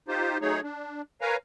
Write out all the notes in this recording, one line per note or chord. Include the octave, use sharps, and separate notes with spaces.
D#4 F4 G4 C5
F#3 A3 D#4 G#4 C#5
D4
A#4 B4 C#5 F5 G#5 A#5